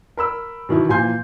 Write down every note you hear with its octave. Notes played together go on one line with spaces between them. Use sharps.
A#4 B5 E6
B2 D#3 E3 E4
A#2 E3 F3 G#5 C6 G6